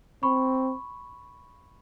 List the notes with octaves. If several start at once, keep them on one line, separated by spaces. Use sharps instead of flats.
C4 B5 C#6